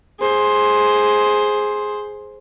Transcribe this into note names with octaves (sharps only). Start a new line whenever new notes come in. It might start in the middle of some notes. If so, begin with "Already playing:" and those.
G#4 C5